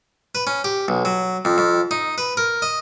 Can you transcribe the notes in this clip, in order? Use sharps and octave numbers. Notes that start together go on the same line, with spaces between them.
B4
C#4
G4
B1
F#3
F2
F2
D#4
B4
A#4
D#5